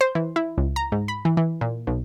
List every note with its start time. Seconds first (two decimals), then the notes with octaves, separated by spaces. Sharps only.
0.01 C5
0.15 E3
0.36 E4
0.58 C#2
0.76 A#5
0.92 G#2
1.08 B5
1.25 E3
1.37 E3
1.61 A#2
1.87 B1